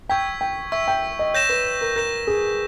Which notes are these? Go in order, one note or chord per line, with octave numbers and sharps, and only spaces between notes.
G5 C#6 E6 G#6 B6
G5
E5 C#6 E6 G#6 B6
G5
D#5
C#5 G6 A#6 E7
B4
A#4
A#4 G6 A#6 E7
G#4